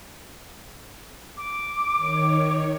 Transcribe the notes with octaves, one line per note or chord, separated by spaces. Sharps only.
D6
D#3 C#5